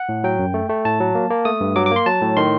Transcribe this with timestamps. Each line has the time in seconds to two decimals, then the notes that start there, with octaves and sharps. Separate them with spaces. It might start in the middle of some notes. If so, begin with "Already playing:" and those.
Already playing: F#5
0.09 A2
0.24 F#3 G5
0.39 F#2
0.54 A3
0.70 A3
0.85 A2 A5
1.00 F#3
1.15 A#3
1.30 A#3
1.45 A3 D#6
1.61 G2
1.76 F#3 D6
1.86 D6
1.91 A#3 C6
2.06 F#3 A5
2.21 A2
2.37 D#3 C6